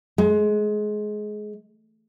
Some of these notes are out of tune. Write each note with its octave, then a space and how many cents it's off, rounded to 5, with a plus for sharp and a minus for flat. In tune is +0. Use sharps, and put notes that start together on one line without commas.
G#3 +20